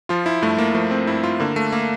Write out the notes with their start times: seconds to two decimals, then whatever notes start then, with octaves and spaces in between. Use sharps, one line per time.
0.09 F3 F4
0.26 E4
0.42 G2 A3
0.58 A#3
0.75 F3 A3
0.91 C4
1.07 G2 E4
1.23 F4
1.40 D3 A#3
1.56 A3
1.72 A#3